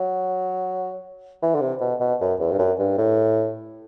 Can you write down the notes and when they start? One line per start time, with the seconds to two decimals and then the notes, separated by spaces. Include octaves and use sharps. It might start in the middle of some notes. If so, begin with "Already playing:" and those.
Already playing: F#3
1.42 E3
1.55 D3
1.61 C3
1.80 B2
2.00 B2
2.21 F#2
2.40 E2
2.52 G2
2.58 F#2
2.79 G2
2.98 A2